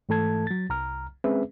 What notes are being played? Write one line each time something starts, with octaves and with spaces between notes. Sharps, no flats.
G#2 E3 A3 A4 A5 G#6
F#3 A6
C2 A#5 F6
G#3 C4 C#4 G#4 B4 E5